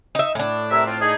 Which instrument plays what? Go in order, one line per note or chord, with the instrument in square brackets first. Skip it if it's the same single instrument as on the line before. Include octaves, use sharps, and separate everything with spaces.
[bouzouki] D#4 E5
A2 D4
[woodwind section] C3 A#4 E5
C4 F4
D#4 G#4